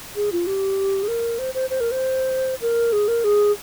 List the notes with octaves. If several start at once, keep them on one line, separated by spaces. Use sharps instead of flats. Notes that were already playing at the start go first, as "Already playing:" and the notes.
G#4
F4
G4
G#4
A#4
C5
C5
C5
A#4
C5
A#4
G#4
A#4
G#4